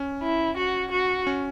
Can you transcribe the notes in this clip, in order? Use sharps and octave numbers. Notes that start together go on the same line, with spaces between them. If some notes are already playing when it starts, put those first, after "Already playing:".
Already playing: C#4
E4
F#4
F#4
C#4